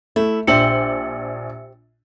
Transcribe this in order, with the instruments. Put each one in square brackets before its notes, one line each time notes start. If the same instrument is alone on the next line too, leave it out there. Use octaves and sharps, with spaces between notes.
[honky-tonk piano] A3 [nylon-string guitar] E4
[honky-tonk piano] A#1 D4 F#7 [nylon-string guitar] G4 C5 [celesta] E5 E6 C#7